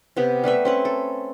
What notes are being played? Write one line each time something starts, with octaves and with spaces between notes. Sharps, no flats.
C3 B3 G4
G3 A3 B4 E5
C4 C#4 B4
A4